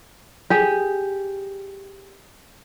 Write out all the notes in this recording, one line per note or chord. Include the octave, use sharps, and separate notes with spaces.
G4 G#4